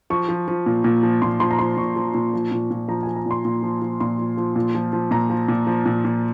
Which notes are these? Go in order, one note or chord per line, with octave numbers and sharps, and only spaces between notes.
F3 C#6
F3
F3
A#2
A#2
F3
A#2 C6
F3 C6
A#5
F3 C6
A#2 C#6
F3
A#2
F3
A#2
A#2
F3 A#5
F3 G#5
A#5
A#2 C6
A#2
F3
F3
A#2 C6
F3
F3
A#2
F3
F3
A#2 A#5
F3
A#2
F3
A#2
A#2